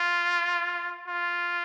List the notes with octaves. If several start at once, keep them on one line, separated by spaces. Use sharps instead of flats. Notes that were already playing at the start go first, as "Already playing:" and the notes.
Already playing: F4
F4